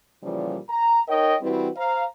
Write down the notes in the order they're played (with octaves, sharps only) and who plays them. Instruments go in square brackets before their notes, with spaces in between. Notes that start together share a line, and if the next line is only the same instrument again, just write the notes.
[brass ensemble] A#2 C#3 E3 F3 G3
A#5
D#4 A#4 C#5 D#5 G5
E3 G3 C4 E4 F#4 B4
C5 F5 A#5